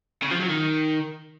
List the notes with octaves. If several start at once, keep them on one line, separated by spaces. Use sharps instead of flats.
C#3
F3
F#3
D#3